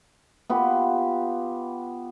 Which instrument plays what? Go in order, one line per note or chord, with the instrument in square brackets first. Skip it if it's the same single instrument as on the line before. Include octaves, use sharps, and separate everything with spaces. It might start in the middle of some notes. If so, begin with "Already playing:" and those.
[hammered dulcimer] B3 F4 G4